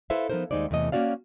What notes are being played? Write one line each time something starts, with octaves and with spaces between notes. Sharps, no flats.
E4 A4 B4 C5 E5 F5
F3 B3 D#4 A#4 C5
D#2 D#3 G#3 D#4 C5 D5
E2 C3 E3 A3 D#5
A#3 C4 C#4 F#4 D5 F5